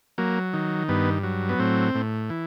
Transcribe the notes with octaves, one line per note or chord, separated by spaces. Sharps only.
F#3 A#3
D#3
G2 B3
F#3
B3
A2 C4
A2
E3